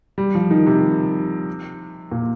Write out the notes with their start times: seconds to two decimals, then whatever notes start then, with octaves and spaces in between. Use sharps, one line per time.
0.18 G3
0.35 F3
0.51 D#3
0.66 C3
2.12 A#2